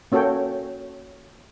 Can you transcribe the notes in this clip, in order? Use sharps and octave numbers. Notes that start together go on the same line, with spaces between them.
A#3 C#4 F#4 A4 C#5 G5